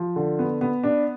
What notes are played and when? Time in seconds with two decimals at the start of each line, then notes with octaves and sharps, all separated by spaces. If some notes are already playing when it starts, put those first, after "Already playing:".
Already playing: F3
0.16 D3
0.39 B3
0.61 B3
0.83 D4